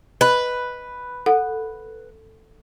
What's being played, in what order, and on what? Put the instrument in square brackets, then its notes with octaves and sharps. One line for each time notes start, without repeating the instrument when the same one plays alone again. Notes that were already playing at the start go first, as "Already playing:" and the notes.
[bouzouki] B4 [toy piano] D#5
[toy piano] A4 [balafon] F#5